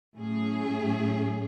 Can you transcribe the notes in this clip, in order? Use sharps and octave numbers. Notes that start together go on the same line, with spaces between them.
A2 F#3 A3 C#4 G#4